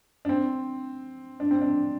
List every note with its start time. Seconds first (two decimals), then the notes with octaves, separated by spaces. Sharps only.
0.25 D4
0.29 C4
1.40 D4
1.51 C4
1.62 D4